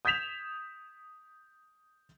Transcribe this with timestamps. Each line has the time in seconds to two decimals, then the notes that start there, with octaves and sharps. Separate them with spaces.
0.05 D#6 G6 G#6 B6 E7 F7